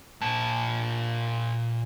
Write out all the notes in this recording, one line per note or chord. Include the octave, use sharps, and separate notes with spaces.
A#2 A5